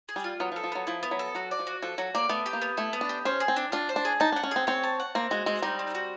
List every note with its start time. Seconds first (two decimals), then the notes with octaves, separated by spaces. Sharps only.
0.09 G#4
0.16 G3
0.24 F4
0.40 F#3 B3
0.52 F3
0.56 A4
0.64 F3
0.72 F#3 B3
0.87 F3 E4
1.03 B3
1.11 F#3
1.19 A4
1.35 F#3 F#4
1.51 D5
1.59 F3
1.67 F#4
1.82 F3 A4
1.98 F#3 F#4
2.15 A#3 D5
2.29 A3 B3
2.46 G4
2.53 A#3
2.61 B3
2.77 A3 E4
2.93 B3
3.01 D4
3.09 G4
3.25 C#4 C5
3.40 G#4
3.48 C4
3.56 D4
3.72 D4 F4
3.89 C5
3.96 D4
4.05 G#4
4.20 D#4 A5
4.32 D4
4.36 F#5
4.43 C#4
4.51 C4 G#4
4.67 C4 C#5
4.83 A5
5.00 F#5
5.15 A#3 C4
5.31 G#3 F#4
5.46 G#3 C4
5.62 G3 D#4
5.79 C4
5.95 F#4